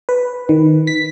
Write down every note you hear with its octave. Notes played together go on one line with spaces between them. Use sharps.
B4
D#3
B6